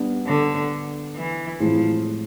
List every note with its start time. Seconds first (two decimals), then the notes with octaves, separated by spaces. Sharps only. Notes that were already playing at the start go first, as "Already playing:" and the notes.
Already playing: G3 B3 D4
0.26 D3
1.16 E3
1.60 A2 E3 F3 G#3 C4 E4